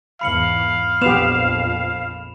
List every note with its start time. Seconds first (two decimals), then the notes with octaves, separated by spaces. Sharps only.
0.21 E2 G#2 F5 B5 C#7 F#7
1.02 A#1 F2 B3 G4 E7 F7